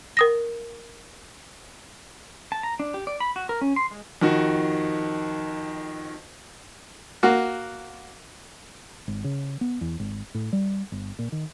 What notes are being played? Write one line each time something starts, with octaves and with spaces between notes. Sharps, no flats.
A#4 D#6 A#6
A5
A#5
D4
G4
D5
B5
F#4
A#4
C#4
C6
G#3
F2 D#3 F#4
A#3 F#4
G#1
C#3
B3
E2
G#1
A2
G3
G1
A#2
D#3